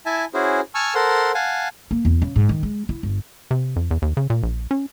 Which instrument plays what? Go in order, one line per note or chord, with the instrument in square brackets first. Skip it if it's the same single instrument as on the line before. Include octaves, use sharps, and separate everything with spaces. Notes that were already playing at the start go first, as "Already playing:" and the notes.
[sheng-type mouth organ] E4 E5 G#5 A5
C#4 E4 F#4 G#4 C5
G#5 A5 C#6 E6 F6
A4 A#4 C5 F#5 C6
F5 F#5 G#5 A5
[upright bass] A#3
E2
C#3
G#2
D#3
G#3
E4
G1
[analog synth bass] C3
F2
E2
D#2
C#3
A#2
A#1
C#4